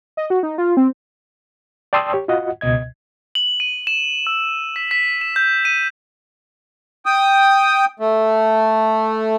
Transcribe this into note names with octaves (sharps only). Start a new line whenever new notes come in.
D#5
F#4
D#4
F4
C4
D5 G5 A5 C6 D#6 E6
G4 C#5
F4 F#4 D#5 F#5
C#2 B2 D#5 G#6
F#7
D#7
E7
E6
B6
B6
E7
G6
D#7
G5 D#6
A3